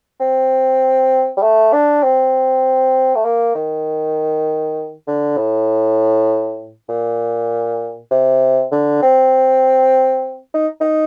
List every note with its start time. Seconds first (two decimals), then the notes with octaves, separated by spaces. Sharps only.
0.20 C4
1.37 G3
1.43 A3
1.73 D4
2.03 C4
3.15 A3
3.25 A#3
3.55 D#3
5.07 D3
5.37 A2
6.89 A#2
8.11 C3
8.72 D3
9.02 C4
10.54 D#4
10.81 D#4